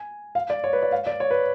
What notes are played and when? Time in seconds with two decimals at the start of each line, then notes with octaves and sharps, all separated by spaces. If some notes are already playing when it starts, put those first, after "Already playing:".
Already playing: G#5
0.35 F5
0.50 D5
0.64 C#5
0.73 B4
0.83 D5
0.92 F5
1.07 D5
1.20 C#5
1.31 B4